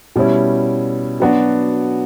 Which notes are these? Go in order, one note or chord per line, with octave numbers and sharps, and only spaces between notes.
B2 G3 C#4 E4
F#3 B3 D4 F#4